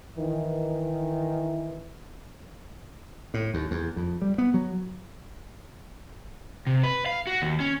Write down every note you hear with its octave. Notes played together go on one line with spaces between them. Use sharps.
D#3 E3
A2
D#2
E2
F2
G3
B3
F#3
C3
B4
F5
F#4
D#2
C#4